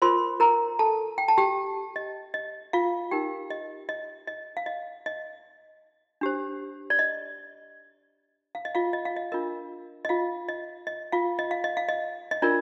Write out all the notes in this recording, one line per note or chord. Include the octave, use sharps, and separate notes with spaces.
F4 A#4 C5 C6
A#4 A#5
A4 A5
G5
A5
G4 G5
D#5
D#5
F4 F5
D#4 G4 A#4 G5
D#5
D#5
D#5
F5
D#5
D#5
D4 G4 C5
D5
D#5
F5
D#5
F4 F5
D#5
F5
D#5
D4 F4 A#4 D#5
D#5
F4 F5
D#5
D#5
F4 F5
D#5
F5
D#5
F5
D#5
D#5
D4 F4 A#4 D5